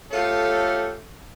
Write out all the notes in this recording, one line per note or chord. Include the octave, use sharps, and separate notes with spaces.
A3 C#4 F4 G4 A4